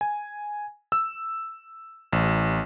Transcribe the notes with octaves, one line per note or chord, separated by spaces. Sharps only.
G#5
E6
A1